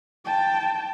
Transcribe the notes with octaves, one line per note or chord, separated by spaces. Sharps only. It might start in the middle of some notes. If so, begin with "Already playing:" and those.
G5 A5